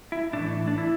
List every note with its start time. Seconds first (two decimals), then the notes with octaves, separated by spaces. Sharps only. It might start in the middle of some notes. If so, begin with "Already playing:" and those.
0.12 E4
0.33 A2 E3 A3 D4
0.67 D4
0.78 E4